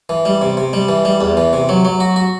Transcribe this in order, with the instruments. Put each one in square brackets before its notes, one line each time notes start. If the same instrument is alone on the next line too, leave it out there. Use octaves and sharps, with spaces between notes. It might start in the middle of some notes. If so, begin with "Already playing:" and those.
[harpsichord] E3
G3
C3
C3
G3
E3
G3
E2
E3
C3
F#3
F#3
F#4
F#4